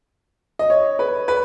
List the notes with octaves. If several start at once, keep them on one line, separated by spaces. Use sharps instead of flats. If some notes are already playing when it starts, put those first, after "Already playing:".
D#5
C#5
B4
B4